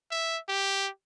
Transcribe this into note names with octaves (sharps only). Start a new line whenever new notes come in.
E5
G4